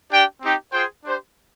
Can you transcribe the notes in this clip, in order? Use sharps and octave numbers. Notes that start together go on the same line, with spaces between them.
D4 G4 D5 G5
C4 D#4 G4
F4 G#4 C5 G5
D4 G4 C5